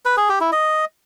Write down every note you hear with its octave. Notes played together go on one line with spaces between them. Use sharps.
B4
G#4
G4
E4
D#5